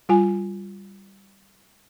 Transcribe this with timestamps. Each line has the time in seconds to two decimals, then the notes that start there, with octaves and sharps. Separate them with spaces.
0.09 G3 F4 G#5